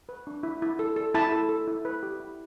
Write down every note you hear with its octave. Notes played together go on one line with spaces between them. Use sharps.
B4
D4
E4
E4
A4
A4
E4 A5
A4
A4
E4
B4
G4
E4